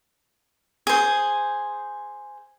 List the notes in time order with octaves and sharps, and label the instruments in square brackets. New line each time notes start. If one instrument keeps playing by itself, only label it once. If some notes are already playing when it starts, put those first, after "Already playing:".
[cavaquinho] G#4 C5